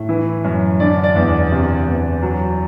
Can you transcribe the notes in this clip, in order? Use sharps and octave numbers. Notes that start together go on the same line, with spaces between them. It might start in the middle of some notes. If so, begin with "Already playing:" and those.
Already playing: A2
E3
F#2
D3 D5
D5
E2
D5
C3
E2
F#3